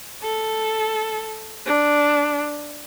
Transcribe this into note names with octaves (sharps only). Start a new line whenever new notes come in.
A4
D4